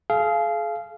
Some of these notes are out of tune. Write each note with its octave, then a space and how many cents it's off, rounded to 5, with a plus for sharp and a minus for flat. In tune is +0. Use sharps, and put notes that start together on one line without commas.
G#4 +40 F5 -20